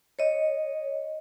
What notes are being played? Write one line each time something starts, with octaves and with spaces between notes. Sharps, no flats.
C#5 D#5